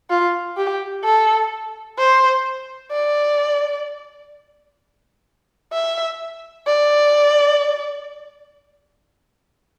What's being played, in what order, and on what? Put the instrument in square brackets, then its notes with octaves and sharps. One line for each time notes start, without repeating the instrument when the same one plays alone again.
[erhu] F4
G4
A4
C5
D5
E5
D5